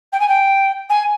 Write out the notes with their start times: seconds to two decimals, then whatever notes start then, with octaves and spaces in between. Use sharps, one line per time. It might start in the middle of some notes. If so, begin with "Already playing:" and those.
0.12 G5
0.19 G#5
0.28 G5
0.89 G#5